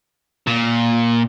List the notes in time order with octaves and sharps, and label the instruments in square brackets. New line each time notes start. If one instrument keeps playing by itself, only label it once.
[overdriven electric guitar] A#2